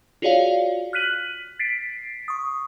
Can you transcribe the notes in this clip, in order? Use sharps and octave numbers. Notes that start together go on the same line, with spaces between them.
F4 F#4 G#4 C#5 D5 F5
F6 F#6 B6 D#7 F#7
A6 B6 C7 D7
C#6 D#6